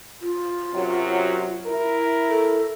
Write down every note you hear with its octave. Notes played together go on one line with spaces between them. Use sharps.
F4
F#2 C3 F#3
E4 A#4
A4